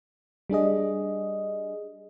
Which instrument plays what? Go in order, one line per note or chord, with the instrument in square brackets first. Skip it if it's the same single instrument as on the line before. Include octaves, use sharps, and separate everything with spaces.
[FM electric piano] G3 D4 G#4 D#5